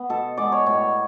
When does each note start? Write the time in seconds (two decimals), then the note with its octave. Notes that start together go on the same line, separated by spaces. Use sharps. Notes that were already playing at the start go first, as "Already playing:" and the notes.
Already playing: B3
0.10 B2 A4
0.37 G#3 B3 D5
0.52 C#5
0.66 A2 C#5